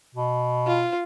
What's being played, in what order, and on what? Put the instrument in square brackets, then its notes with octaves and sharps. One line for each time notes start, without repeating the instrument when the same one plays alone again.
[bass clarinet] B2
[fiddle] F4